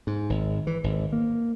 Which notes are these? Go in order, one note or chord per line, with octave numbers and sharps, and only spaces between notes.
G#2
G#1
E3
G#1
A#3